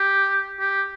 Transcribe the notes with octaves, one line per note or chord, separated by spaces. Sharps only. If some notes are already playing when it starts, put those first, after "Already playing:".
Already playing: G4
G4